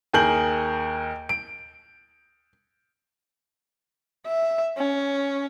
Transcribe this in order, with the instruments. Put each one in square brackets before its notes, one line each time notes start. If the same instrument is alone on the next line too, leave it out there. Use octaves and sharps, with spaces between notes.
[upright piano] D#2 G#4 A#4 G6 F#7
D7
[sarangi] E5
C#4